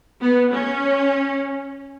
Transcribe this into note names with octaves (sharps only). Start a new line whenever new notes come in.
B3
C#4